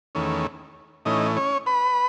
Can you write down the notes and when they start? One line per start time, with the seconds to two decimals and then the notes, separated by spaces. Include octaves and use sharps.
0.15 E2 D#3 A3 C#4
1.05 A2 E3 A3 C#4 D#4 D#5
1.36 C#4 C#5
1.66 B4 B5